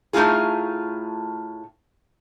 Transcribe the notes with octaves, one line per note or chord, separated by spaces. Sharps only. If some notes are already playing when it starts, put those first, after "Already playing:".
A2 A3 A#3 D#4 F4 G#4